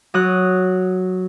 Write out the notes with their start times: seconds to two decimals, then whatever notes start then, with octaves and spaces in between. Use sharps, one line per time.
0.14 F#3 D#6 F#6